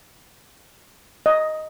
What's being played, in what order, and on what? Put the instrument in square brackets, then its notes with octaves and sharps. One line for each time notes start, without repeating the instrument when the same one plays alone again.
[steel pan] D#5